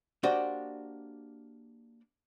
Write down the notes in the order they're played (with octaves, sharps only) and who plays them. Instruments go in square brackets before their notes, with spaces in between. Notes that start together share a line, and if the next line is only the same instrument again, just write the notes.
[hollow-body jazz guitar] A#3 D4 F#4 G4 C5 D#5